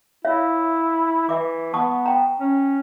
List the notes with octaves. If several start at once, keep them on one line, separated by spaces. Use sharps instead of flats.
E4 C#5 E5 F5
E3 E5 D6
B3 A5 C#6 D#6
G5 A#5
C#4